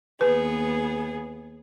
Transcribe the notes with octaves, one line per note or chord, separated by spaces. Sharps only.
D#2 B3 G#4 B4